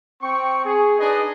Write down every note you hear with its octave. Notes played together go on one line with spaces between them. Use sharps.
C4 G5 C#6
G#4
D4 D#4 G#4 B4 D#5